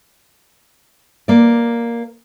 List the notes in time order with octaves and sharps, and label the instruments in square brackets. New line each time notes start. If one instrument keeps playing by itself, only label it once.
[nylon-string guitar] A#3 D5